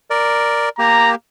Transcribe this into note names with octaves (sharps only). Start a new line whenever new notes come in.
A#4 D5
A#3 G4 A#5